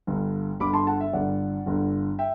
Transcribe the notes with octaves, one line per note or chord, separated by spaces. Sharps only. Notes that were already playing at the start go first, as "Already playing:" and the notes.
G1 G2 D3
G1 G2 D3 B5 D6
A5 C6
F#5 A5
E5
G1 G2 D3 D5 F#5
G1 G2 D3
E5 G5